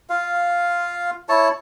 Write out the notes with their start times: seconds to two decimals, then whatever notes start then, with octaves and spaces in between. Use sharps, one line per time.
0.09 F4 F5
1.29 E4 C#5 A5